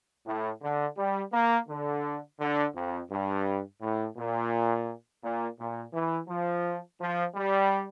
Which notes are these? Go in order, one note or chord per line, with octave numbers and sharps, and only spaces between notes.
A2
D3
G3
A#3
D3
D3
F2
G2
A2
A#2
A#2
A#2
E3
F3
F3
G3